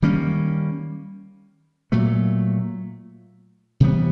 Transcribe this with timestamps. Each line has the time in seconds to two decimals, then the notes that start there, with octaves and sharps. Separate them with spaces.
0.02 D#3 G3 A#3 C#4
1.92 A#2 F#3 A3
3.80 C3 E3 G3 B3